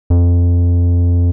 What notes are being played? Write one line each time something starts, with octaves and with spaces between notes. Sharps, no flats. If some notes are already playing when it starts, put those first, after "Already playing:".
F2